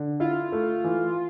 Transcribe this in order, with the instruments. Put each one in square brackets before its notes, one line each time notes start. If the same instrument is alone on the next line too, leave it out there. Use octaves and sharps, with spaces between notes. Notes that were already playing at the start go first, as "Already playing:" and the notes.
Already playing: [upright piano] D3
[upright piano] E4 [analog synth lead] F4
[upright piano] A3
E3